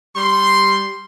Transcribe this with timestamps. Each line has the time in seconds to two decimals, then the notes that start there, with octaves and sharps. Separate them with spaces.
0.15 G3 C6